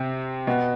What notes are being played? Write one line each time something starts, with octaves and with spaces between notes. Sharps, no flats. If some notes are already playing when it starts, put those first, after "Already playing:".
Already playing: C3 C4
B2 B3